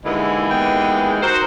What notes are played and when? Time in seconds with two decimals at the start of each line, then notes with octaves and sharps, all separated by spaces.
0.05 D#2 D3 E3 G#3 E4
0.50 B3 G5
1.22 D#4 F#4 A#4 C5 F#5